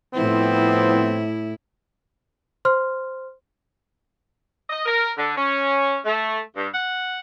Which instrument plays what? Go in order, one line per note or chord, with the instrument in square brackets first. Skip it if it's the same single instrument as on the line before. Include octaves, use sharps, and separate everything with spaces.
[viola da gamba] A2 E4 [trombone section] F3 B3 C4
[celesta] C5 C6 F6
[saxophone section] D#5
A#4
D3
C#4
A3
G2
F#5